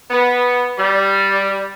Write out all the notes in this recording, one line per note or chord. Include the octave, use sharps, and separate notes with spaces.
B3
G3